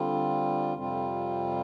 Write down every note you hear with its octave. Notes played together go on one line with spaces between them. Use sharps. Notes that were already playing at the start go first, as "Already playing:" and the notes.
Already playing: D3 G3 C4 F4
F2 C3 G3 C4 F4